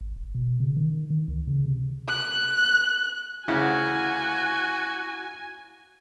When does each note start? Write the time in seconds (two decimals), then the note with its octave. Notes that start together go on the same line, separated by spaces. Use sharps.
0.01 G#1
0.16 D1
0.35 B2
0.60 C#3
0.77 D#3
1.10 D#3
1.28 C#2
1.47 C#3
1.66 C3
2.08 F#6
3.48 D2 C#3 E4 F#4 F#5 G#5